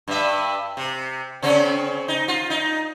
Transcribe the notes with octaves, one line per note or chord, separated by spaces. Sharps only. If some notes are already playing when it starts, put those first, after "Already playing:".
G2 E5
C3
C#3 C4 C#4
D#4
F4
D#4